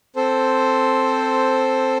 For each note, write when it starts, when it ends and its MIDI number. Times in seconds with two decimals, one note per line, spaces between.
0.16 1.98 60
0.16 1.98 69
0.16 1.98 72